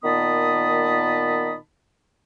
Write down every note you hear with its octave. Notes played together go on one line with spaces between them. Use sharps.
A#2 D#3 B3 A5 B5 D#6